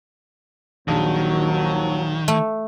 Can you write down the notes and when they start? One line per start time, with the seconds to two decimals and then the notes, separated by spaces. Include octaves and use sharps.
0.88 A#1 D#2 D#3 F3 F#3
2.28 A3